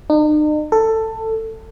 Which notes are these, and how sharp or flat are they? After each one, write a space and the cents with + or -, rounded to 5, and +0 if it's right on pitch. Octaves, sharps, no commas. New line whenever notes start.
D#4 -45
A4 +15